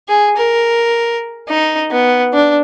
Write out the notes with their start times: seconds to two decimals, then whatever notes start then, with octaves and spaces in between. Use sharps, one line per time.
0.08 G#4
0.36 A#4
1.49 D#4
1.91 B3
2.34 D4